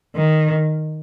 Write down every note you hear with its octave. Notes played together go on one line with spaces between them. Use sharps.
D#3